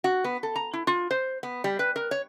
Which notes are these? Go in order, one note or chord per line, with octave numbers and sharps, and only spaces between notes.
F#4
B3
A4
A#5
E4
F4
C5
B3
G3
B4
A#4
C#5